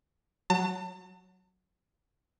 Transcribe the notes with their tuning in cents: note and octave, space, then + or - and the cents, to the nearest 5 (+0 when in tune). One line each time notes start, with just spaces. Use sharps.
F#3 +0 A5 +40